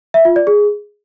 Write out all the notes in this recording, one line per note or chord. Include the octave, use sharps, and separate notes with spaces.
E5
F4
D5
G#4